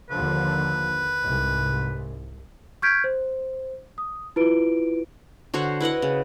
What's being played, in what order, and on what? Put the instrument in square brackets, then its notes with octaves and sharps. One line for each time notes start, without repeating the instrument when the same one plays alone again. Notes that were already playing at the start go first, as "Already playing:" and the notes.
[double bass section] D#2 D3 F3 [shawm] B4
[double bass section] C2 G#2
[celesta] C#6 F6 G6 G#6 B6 D7
C5
D#6
E4 F4 B4 D7
[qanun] D3 F#4 C5 C#5
E4 B4 D#5 F#5
C#3